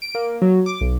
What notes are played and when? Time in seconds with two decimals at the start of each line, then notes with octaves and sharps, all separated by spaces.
0.02 D7
0.15 A#3
0.42 F#3
0.66 D6
0.81 B1